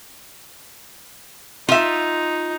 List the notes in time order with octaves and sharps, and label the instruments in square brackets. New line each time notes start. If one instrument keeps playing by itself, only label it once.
[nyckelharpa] D#4 [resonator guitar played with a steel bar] F4 E5